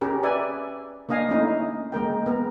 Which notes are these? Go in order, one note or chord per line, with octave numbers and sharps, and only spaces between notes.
C#4 G4 G#4 A#4
B4 D5 E5 G#5
A#3 D4 D#5 F5 G#5
A3 C#4 D#4 E4
G#3 A#3 A#4 G5
B3 A#4